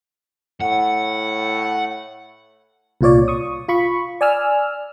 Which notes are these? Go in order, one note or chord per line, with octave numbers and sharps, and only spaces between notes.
A2 F#5
C2 A#2 F4 C#5 D5
C#6 D#6
F4 B5 C#6
D5 G#5 E6 F6